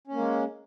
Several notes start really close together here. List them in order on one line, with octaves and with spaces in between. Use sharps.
C#4 A#3 G#3